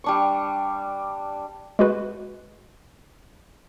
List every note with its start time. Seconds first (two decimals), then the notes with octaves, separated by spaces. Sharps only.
0.04 G3 D4 C#6
1.79 G#3 F#4 B4